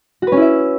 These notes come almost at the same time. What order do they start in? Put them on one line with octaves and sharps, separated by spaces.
F#4 B4 C#4 E4 E5